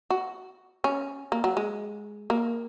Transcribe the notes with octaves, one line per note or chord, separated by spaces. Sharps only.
F#4
C#4
A#3
F#3
G#3
A#3